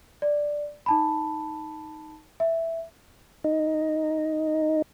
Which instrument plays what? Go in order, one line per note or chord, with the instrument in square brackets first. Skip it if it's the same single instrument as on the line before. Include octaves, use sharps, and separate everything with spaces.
[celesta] D5
D#4 A5 B5
E5
[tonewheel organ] D#4